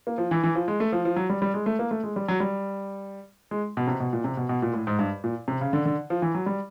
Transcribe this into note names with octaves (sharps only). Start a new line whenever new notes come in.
A#3
F3
E3
E3
F3
G#3
A3
F3
F3
F#3
G3
G3
G#3
A3
A#3
A3
G#3
G3
F#3
G3
G#3
B2
C3
B2
A#2
C3
B2
B2
A#2
A2
G#2
G2
A#2
C3
C#3
D3
D3
F3
E3
F#3
G3